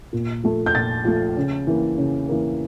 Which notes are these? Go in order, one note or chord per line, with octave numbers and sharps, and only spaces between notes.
A#2
F3 A3
G6
A#2 A6
F3 A3
C#3
E3 A#3
C#3
E3 A#3